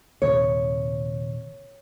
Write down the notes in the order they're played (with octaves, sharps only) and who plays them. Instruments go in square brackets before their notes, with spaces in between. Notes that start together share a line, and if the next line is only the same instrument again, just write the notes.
[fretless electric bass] D#1 D#2 C3 [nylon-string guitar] C#5